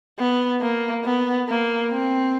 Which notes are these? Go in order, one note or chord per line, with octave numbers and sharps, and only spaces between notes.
B3
A#3
B3
A#3
C4